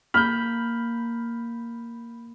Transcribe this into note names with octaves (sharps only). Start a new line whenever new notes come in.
A#3 B5 F6 G6